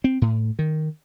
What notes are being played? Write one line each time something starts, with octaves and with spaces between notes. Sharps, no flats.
C4
A2
D#3